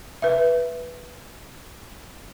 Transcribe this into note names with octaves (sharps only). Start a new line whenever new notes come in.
B4 E5